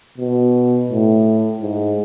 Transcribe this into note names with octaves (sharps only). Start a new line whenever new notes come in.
B2
A2
G#2